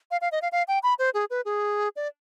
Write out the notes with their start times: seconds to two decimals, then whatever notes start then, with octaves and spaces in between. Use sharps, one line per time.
0.11 F5
0.21 F5
0.32 D#5
0.42 F5
0.52 F5
0.68 G5
0.83 B5
0.99 C5
1.14 G#4
1.30 B4
1.45 G#4
1.96 D5